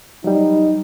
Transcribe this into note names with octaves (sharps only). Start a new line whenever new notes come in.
F#3 G3 D#4